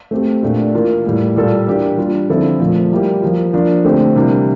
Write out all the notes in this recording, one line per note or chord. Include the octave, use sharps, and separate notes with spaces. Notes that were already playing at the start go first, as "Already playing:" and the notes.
A3 C4 G4
A#2 A3 D4 G4
E3 A#3 F4 A#4
A2 G3 A#3
A#2 G3 A#3 F4 A4
E3 A#3 D4 G4
G3 D4 F4
D3 F3 C4 E4 A4
A#2 F3 A3
G3 A#3 E4 G4
F3 A#3 F4
F3 A#3 D4 F4
D3 A3 C4 G4 C5
C3 E3 G3 A#3 D4